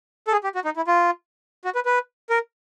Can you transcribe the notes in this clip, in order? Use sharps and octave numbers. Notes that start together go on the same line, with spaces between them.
A4
G#4
G4
F#4
D#4
E4
F4
F#4
B4
B4
A#4